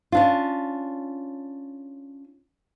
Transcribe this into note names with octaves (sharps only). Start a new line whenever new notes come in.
C#4 D4 F4